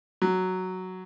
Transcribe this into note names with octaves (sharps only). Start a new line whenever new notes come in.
F#3